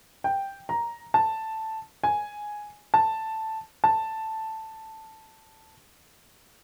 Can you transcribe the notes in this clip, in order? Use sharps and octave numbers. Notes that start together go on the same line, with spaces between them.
G5
A#5
A5
G#5
A5
A5